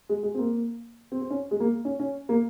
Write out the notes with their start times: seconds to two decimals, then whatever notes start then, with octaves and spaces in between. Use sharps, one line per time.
0.09 G#3
0.23 G#3
0.34 C4
0.39 A#3
1.12 C4
1.22 C4
1.30 C#4
1.51 G#3
1.60 A#3
1.85 C#4
1.99 C#4
2.29 A#3